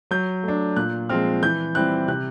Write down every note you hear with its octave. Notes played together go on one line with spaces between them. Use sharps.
F#3 G6
A3 D4
A#2 F#6
F3 G#3 C4 F6
E3 G6
G3 C4 E4 F#6
C3 F#6